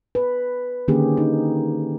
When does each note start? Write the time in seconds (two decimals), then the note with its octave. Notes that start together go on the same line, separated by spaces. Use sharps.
0.15 B4
0.88 D3 D#3 A#3 C#4 G4 G#4
1.17 D#4